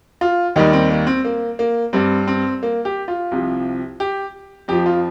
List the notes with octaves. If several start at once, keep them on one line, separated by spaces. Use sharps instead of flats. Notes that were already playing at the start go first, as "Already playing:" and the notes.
F4
D#2 D#3 G3 D#4
C4
A#3
C4
A#3
A#3
G2 G3 C4
C4
A#3
G4
F4
C2 C3 F3
G4
F2 F3 G4
F4